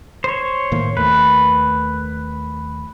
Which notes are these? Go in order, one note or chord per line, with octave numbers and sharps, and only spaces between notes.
C5 C#5
A2 D#3 A#3
D#2 D#3 A3 B4